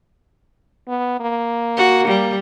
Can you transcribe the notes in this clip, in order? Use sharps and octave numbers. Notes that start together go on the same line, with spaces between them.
B3
A#3
F#4
G3